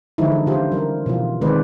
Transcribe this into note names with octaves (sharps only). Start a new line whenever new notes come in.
D3 E3 F3 G#3 D#4 E4
A4
C#3 F4 G4 C5
G3 A#4
B2 E3 F3 F4
D#3 G#3 C4 B4 C5 D5